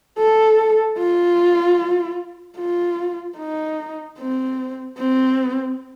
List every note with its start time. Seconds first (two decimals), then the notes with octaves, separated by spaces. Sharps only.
0.18 A4
0.98 F4
2.58 F4
3.38 D#4
4.19 C4
4.99 C4